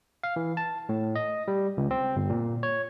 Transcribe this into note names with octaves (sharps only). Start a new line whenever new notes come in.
F5
E3
A5
A2
D#5
G3
C#2
C4
G1
A#2
C#5